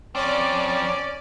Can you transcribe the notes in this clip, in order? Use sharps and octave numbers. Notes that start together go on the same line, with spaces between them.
F2 C4 C#4 D5